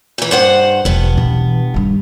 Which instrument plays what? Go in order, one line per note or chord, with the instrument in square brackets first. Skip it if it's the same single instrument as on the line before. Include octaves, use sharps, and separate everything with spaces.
[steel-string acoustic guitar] A#2 E3
G2 C5 F#5
[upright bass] E1 F3 [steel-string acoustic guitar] G2 B3
[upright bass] B2 E3
G2 D#3